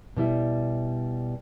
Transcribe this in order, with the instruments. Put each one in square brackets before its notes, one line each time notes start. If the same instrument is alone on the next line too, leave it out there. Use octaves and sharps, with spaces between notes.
[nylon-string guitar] B2 G3 E4 E5